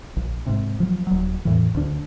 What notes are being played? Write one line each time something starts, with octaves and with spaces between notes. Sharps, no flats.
A#1
G#2 C3
F3 F#3
D#1 F#3
E2 A2 E3
D2 D4